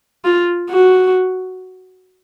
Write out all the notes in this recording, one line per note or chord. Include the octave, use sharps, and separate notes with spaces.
F4
F#4